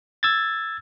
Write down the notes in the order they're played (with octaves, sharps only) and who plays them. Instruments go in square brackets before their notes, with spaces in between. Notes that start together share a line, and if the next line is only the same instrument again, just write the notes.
[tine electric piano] E6 G#6 A6